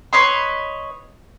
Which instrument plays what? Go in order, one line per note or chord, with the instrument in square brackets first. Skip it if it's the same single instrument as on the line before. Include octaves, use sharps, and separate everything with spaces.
[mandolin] B4 C#5 D#5 C6